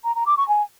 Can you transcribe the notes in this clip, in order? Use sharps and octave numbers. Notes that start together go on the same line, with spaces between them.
A#5
A#5
D6
C#6
G#5